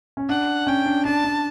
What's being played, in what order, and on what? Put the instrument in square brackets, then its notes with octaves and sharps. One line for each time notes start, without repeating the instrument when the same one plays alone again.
[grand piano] C#4
[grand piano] D4 [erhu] F#5
[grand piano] C#4 [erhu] G5
[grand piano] D4
[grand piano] D4 [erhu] A5
[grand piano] D4